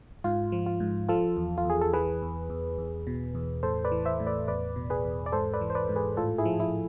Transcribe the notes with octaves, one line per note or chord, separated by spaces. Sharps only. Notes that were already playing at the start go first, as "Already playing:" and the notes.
G#2 F4
F3
F4
G#2
F3 F4 A4
E2
F4
E2 G#4
A4
E3 G#4 B4
E2
E2
E2
B2
E2
A2 A4 C5
B4 D5
E3
C5 E5
A2
B4 D5
E2 B4 D5
B2
G#4 B4
E2
D5
G#2 A4 C5
B4 D5
E3
C5
B4 D5
G#2
G#4 B4
A2 F4 A4
E4 G#4
F3
E4